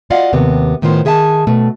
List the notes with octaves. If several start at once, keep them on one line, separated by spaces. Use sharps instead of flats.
F4 F#4 D5 D#5 F5 F#5
D#2 C3 B3
A2 D#3 B3 F4 C5
D#3 G#4 E5 F#5 A5
B2 A3